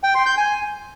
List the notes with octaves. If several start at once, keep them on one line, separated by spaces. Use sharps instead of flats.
G5
C6
G6
G#5